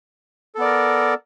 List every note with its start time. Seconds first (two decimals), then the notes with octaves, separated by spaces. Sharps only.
0.55 A4
0.58 B3
0.61 D5
0.64 A#4